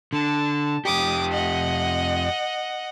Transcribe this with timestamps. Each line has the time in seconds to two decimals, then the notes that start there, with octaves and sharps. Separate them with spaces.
0.13 D3 A5
0.85 F2 G4 D6 D#6
1.32 D#5 F#5